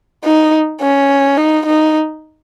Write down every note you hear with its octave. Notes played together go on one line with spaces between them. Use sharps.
D#4
C#4
D#4
D#4